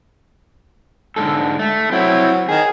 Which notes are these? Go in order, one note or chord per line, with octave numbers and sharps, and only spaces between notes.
G#2 D3 A4
A3
F#3 C4 E4
D#3 G#4